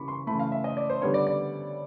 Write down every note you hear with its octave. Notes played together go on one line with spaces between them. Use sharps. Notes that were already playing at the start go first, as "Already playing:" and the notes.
Already playing: C#3 E3 G3 A#3 B5 C#6 D6
C6
C#3 E3 A3 B5
F5
E5
D#5
D5
C5
D3 G3 B3 C#5
D5
D5